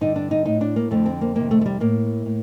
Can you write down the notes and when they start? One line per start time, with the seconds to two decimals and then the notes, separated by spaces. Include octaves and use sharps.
0.01 G2 D3 D#4
0.16 D4
0.31 D#4
0.45 A2 D#4
0.61 D4
0.76 A#3
0.91 F2 D3 A3
1.06 C4
1.21 A#3
1.35 F2 C3 D#3 A#3
1.51 A3
1.61 A3
1.66 G3
1.80 A2 A#3
2.26 A2